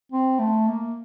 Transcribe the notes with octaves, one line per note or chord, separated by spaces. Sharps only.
C4
A3
A#3